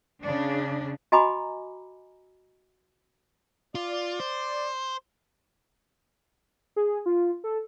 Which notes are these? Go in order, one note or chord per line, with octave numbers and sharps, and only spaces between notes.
C#3 D4
F#4 D#5 G#5 A#5 B5 D6
F4 D5
C5
G#4
F4
A4